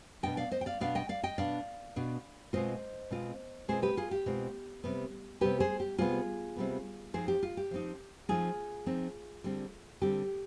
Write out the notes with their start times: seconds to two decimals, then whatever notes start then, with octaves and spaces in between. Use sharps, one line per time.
0.23 B2 B3 D4 D#5 G5
0.37 D5 F5
0.51 C5 D#5
0.61 G5
0.66 D5 F5
0.80 B2 B3 D4 D5 F5
0.95 D#5 G5
1.09 D5 F5
1.23 D#5 G5
1.38 B2 B3 D4 D5 F5
1.96 B2 B3 D4
2.53 B2 G#3 C4 F4 C5 D#5
3.11 B2 G#3 C4 F4
3.68 B2 G#3 C4 F4 G#4 C5
3.82 G4 B4
3.97 F4 G#4
4.11 G4
4.26 B2 G#3 C4 F4
4.84 C3 G3 B3
5.41 C3 G3 B3 G4 B4
5.60 G#4 C5
5.80 G4
5.98 C3 G3 B3 F4 G#4
6.56 C3 G3 B3
7.14 F3 C4 D#4 G#4 C5
7.28 G4
7.43 F4
7.57 G4
7.71 F3 C4 D#4
8.29 F3 C4 D#4 F4 G#4
8.86 F3 C4 D#4
9.44 D3 G3 C4
10.01 D3 G3 C4 G4